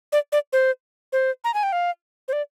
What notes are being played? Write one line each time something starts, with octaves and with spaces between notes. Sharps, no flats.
D5
D5
C5
C5
A#5
G#5
G5
F5
C5
D5